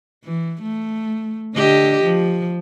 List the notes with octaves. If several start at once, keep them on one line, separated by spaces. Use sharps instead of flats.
E3
A3
D3 G4 D#5
F3